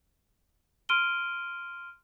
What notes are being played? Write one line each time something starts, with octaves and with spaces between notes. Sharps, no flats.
C6 F6 D7 D#7 G7